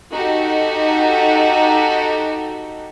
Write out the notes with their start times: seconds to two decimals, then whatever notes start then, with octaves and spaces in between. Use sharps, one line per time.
0.13 D#4 F#4 G4 A4